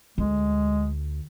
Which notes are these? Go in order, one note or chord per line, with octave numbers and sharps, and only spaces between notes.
D2 G#3